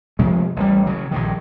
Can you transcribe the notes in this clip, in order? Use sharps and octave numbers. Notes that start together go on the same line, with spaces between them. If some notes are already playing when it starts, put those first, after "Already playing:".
C3 F3 G#3 A3
A1 G3
C#3 F#3
A#1 G2 D#3